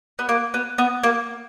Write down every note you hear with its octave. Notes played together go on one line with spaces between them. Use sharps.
B3
A#3
B3
B3
A#3